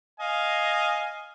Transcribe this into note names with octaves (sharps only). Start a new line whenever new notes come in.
D#5 F5 G#5